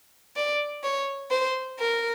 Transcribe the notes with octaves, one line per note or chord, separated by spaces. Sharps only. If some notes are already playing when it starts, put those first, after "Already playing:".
D5
C#5
C5
A#4